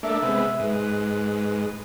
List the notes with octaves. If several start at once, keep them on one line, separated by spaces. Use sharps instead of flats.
A3 A#3 D4 E5
C3 G#3 B3
G#2 B4